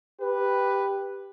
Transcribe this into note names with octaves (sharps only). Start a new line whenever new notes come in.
G4 B4